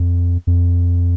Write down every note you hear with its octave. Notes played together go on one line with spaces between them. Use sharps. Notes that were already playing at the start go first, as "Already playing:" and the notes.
Already playing: F2
F2